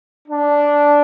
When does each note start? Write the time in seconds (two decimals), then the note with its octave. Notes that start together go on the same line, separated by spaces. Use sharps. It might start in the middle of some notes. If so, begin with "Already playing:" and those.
0.28 D4